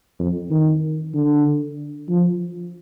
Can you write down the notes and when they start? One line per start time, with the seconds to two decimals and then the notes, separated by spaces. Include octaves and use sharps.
0.19 F2
0.51 D#3
1.14 D3
2.10 F3